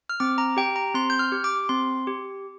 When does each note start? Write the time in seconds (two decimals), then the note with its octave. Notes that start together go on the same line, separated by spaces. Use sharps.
0.10 F6
0.20 C4 D6
0.38 A#5
0.57 G4 G5
0.76 A#5
0.94 C4 C6
1.10 G6
1.19 F6
1.32 G4
1.44 D6
1.69 C4 C6
2.07 G4